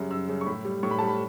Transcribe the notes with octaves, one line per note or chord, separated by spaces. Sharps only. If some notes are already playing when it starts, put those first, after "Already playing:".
Already playing: F#2 C#3 G3
F#2 E6
C#3 G3
C#6
A2 B5
G3
A2 C#6
B5
A5
G3
B5